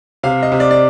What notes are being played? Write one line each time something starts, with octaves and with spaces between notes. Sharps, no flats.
C3 F5
D#5
C3
D5
D5